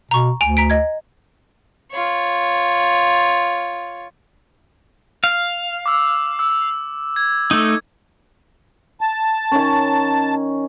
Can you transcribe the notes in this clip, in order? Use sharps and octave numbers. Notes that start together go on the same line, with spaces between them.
B2 A#5 C#6
D2 G#5 D7 F7
A#5 B6 D7
D#5 G#6
F4 C#5
F5
D6 E6
E6
G#6
A3 D#4
A5
D#3 C#4